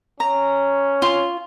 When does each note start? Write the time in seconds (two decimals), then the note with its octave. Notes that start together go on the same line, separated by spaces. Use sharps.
0.20 C#4 A#5
1.02 F4